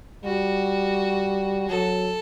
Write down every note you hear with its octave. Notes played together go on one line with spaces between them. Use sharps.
G3 F#4
F#3 A4